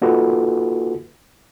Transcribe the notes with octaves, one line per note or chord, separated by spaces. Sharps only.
A#3 D#4 F4 F#4 A4 B4